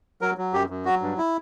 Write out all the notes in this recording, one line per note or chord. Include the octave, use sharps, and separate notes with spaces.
F#3 A#4
F#3
F#2 G4
F#2
F#3 F#4
G2
E4